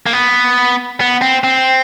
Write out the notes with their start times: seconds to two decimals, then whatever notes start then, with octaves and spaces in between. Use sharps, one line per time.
0.06 A#3
0.13 B3
1.01 B3
1.22 C4
1.44 C4